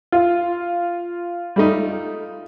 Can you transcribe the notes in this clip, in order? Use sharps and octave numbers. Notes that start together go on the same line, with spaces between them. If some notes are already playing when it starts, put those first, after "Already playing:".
F4
G3 A3 D#4